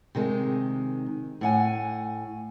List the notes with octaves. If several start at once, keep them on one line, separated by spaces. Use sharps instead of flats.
C3 D#3 G#3
A2 F#5 G#5